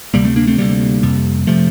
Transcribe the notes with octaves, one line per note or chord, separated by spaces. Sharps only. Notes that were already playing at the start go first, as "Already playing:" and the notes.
D2 C3 G3 A#3
A3 C4
A#3 D4
A3 C4
D2 C3 G3 A#3
F2 C3
C3 F3 A3